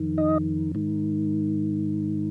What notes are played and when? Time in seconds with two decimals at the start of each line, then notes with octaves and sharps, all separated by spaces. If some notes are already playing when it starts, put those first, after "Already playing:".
Already playing: F2 D#3
0.18 D#4 D#5
0.75 G#2 D#3